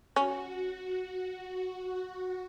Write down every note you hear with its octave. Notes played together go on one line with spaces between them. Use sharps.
C#4 F#4